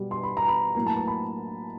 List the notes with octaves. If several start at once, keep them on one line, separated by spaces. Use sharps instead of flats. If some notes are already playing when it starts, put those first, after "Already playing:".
Already playing: B2 G3 B3
C6
B5
A#5
B5
A2 F#3 A#3 A#5
A5
A5
B5